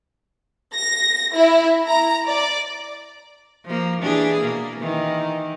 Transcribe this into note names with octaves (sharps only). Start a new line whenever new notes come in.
A#6
E4
A#5
D5
F3 A#3
E3 D4 G#4
B2 A#3
D#3 E3